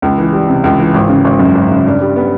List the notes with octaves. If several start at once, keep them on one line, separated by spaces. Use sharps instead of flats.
C#2
E3
G3
C3
C#2
E3
G#1
C#3
G#1
F#2
G#1
C#3
G2
G3
B3